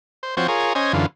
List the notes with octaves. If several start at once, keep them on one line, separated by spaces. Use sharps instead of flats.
C5
F3 C4 F#4 C5 C#5
F4 G#4 A#4 C#5
C#4 C5 D#5 G#5
F#2 D3 E3 F4